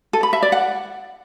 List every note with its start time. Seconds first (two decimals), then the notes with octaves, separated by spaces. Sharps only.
0.13 A4
0.23 B5
0.33 E5
0.42 D5
0.52 F#5